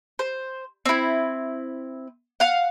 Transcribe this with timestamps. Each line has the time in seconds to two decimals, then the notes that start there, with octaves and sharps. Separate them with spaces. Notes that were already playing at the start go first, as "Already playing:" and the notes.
0.19 C5
0.85 C4 E4
2.40 F5 F#5